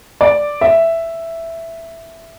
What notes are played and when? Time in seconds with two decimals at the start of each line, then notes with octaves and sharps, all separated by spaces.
0.21 D5
0.61 E5